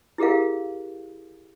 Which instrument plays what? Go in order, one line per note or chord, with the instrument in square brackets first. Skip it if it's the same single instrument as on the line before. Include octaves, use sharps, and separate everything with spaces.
[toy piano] E4 G4 G#4 A#4 F5